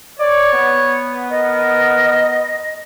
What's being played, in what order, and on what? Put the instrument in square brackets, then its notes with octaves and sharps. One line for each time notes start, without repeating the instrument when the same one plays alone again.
[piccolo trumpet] C#5 [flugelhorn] D5
[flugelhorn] B3
[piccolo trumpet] A#4 [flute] D#5